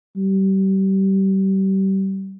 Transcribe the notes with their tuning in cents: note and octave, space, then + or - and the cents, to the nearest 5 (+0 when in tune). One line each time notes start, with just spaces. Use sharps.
G3 -30